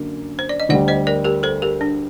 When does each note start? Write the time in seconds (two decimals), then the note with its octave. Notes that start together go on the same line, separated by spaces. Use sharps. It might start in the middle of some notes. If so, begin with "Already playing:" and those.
Already playing: F#2 D3 A#3
0.39 C5
0.49 D5
0.60 D#5
0.69 D2 D3 G3 D5 F#5
0.88 C5 D#5
1.07 A#4 D5
1.25 G4 A#4
1.43 A4 C5
1.62 G4 A#4
1.81 D4